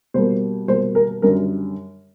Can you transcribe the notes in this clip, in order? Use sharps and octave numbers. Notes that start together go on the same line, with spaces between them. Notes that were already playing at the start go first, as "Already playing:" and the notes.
B2 G3 A#3 C5
B2 G3 A#3 C5
A#4
F#2 D3 G3 A#4